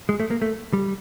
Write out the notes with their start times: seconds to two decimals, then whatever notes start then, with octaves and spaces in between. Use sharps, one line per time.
0.09 G#3
0.20 A3
0.31 A#3
0.42 A3
0.73 G3